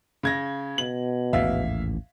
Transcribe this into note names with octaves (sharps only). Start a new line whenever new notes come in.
C#3 G#6 A#6
B2 F#7
A1 D#2 G#2 E5 F5